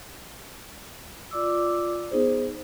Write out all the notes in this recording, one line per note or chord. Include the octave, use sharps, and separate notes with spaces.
F4 D5 D6 E6
B3 D#4 G#4 C5